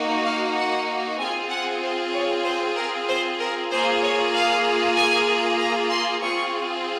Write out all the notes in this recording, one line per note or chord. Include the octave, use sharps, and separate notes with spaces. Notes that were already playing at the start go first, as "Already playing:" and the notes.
Already playing: A#3 D#4 F#4
F5
F#5
C4 F4 G#4 G#5
F#5
C5
C#5
C5
A#4
C5
A#4
A#3 F4 G#4 C5
C#5
F5
G#5
A#5
C6
C4 F4 G#4 C#6